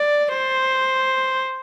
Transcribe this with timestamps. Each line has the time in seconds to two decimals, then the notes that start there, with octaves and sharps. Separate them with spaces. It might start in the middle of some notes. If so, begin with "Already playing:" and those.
Already playing: D5
0.32 C5